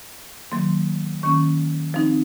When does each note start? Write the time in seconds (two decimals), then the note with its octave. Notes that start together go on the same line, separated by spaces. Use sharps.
0.52 D#3 F#3 A#3 C6
1.23 D#3 A#3 C#4 C#6
1.94 F3 C4 D#4